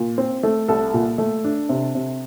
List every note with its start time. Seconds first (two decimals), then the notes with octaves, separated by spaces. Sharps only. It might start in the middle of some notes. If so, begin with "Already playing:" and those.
Already playing: A#2
0.18 C4
0.43 A3
0.68 C2 A4
0.94 A#2
1.18 A3
1.44 D4
1.69 C3
1.95 C3